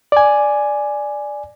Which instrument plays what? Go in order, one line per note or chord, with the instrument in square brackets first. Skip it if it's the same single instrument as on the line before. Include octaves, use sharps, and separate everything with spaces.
[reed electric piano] D5 G#5